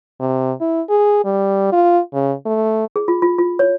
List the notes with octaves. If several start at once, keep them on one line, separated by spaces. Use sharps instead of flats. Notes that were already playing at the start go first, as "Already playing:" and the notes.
C3
E4
G#4
G3
F4
C#3
A3
G#4
F4
F4
F4
C#5